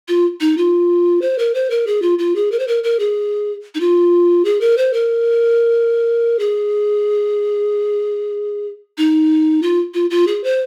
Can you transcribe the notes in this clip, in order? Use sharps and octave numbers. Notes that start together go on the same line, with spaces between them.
F4
D#4
F4
C5
A#4
C5
A#4
G#4
F4
F4
G#4
A#4
C5
A#4
A#4
G#4
D#4
F4
G#4
A#4
C5
A#4
G#4
D#4
F4
F4
F4
G#4
C5